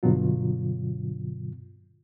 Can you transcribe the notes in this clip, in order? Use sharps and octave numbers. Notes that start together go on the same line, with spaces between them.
G2 B2 D3 F#3 F4